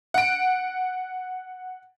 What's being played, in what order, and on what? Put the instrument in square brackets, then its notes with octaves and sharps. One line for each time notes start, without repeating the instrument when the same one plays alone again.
[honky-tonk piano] F#5 D7